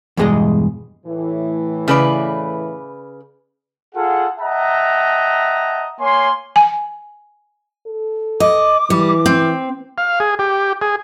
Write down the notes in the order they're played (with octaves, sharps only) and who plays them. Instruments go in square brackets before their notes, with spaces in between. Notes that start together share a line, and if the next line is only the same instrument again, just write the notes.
[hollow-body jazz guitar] E2 G2 B2 G#3 G#4 D#5
[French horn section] A2 E3
[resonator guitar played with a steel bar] C#3 B4 D5
[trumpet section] F4 G#4 A4 F#5
D#5 E5 F#5 G5 A5 A#5
A#3 C#5 G#5 C6
[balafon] G#5
[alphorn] A4
[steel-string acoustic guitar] D#5 [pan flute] D6
[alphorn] E3 [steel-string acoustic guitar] G3
[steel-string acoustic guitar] C4
[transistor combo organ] F5
G#4
G4
G#4